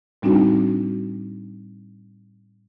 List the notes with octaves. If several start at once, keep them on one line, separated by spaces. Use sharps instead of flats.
A2 G3 C4 D4 D#4 F#4